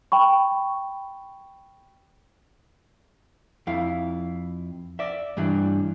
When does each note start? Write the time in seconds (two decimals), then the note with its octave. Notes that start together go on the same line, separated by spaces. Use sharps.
0.12 G5 B5 C#6
3.67 F2 E4 F5
4.99 D5 E5
5.37 G2 E3 G3 D4